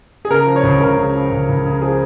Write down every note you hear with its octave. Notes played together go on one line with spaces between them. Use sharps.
G#4
C#3 A#4
F3
C#5
C#2
C#2 A#4
C#3
F3
C#2
C#2
C#3
F3 G#4